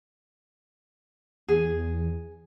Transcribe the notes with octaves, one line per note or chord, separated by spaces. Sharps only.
E2 G#4